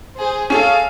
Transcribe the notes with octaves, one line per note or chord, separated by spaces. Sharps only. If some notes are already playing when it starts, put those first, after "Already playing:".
G#4 C5
C#4 G#4 A4 F5